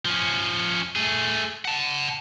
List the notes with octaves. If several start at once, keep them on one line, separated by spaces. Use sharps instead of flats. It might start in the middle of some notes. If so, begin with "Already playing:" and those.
F3 C#4
A3 G#4
F#5 A5